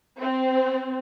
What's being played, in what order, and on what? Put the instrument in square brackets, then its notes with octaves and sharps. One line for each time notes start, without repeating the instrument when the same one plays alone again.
[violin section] C4